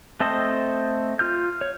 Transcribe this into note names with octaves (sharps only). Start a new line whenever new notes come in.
A3 C4 A4 C5 D#5
F4 F6 G6
C#5